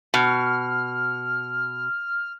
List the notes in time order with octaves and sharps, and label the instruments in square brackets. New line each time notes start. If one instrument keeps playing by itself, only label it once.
[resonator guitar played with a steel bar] B2 [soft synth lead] F6